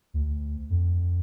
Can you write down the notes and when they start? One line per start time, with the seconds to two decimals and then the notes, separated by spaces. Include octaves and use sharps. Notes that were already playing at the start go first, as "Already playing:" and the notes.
0.14 D2
0.70 F2